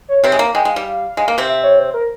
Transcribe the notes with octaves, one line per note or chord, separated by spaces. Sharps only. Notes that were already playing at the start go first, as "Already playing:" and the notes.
C#5
C3 C4 C#5
G#3
A#3 A#5
G#3 G5
G#3
F5
G3
G#3
A#3
C3 C4
E5
C#5
C5
A#4